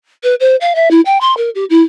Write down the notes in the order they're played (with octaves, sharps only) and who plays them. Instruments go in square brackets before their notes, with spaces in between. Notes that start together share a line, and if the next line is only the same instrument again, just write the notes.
[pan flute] B4
C5
F5
E5
E4
G5
C6
A#4
G4
E4